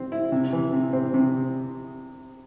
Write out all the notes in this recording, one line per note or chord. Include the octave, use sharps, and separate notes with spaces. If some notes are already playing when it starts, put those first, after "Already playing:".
Already playing: C4
E4
C3
E3
C3
C4
C3